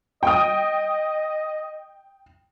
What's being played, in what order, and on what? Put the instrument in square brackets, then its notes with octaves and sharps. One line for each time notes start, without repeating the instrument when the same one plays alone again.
[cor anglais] D#5 [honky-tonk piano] G5 D#6